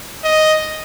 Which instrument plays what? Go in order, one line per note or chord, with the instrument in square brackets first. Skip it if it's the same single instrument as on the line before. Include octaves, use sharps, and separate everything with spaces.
[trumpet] D#5